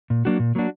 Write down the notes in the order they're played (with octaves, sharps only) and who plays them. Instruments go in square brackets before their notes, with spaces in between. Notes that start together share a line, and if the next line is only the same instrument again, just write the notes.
[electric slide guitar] A#2
F#3 A#3 D4 F#4
A#2
F#3 A#3 D4 F#4